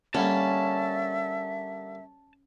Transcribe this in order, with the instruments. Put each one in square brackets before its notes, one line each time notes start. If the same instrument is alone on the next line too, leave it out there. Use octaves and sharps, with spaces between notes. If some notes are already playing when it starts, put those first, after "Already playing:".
[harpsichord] D3 G3 A#3 [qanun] C#4 [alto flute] E5 [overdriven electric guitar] A5